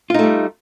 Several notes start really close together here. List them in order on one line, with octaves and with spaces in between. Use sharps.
F4 D#4 A3 G3